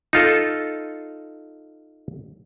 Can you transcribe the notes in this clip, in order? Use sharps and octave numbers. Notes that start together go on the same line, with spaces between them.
D#4 F4 A4